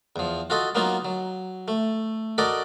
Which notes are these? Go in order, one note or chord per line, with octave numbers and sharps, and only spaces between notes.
E2 F3
F4 F#4 A4 D#5
F#3 A#3 B3 D#4 F4
F#3
A3
F#4 A4 A#4 D5 D#5